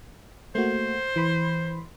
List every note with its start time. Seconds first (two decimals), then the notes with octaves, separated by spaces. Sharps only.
0.55 A3 A#3 F#4 C5
1.16 E3 B5 C6